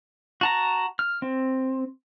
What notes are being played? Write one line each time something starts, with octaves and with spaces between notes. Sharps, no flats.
F#4 A5 A#5
F6
C4